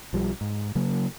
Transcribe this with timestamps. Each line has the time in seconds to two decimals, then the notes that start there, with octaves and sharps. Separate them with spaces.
0.13 B1 F3 G3
0.41 G#2
0.75 C#3 F#3 A#3